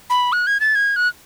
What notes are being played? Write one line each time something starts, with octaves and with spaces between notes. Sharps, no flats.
B5
F#6
G#6
A6
G#6
F#6